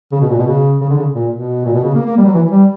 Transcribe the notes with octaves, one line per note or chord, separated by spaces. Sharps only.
C#3
B2
A#2
B2
C#3
C#3
D3
C#3
A#2
B2
A#2
B2
C#3
A#3
A#3
G3
F#3
E3
G3